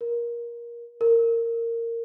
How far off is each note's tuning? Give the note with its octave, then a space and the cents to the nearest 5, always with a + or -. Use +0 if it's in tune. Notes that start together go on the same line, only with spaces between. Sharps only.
A#4 +20
A#4 -15